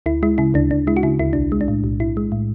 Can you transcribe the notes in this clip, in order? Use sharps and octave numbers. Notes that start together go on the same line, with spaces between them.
D2 E4
G#3 E4
C#3 E4
D2 D4
D2 D4
G#3 E4
F#4
C#3 E4
D2 E4
B1 D4
G#3
D4
A2
B1
B1 E4
G#3
A2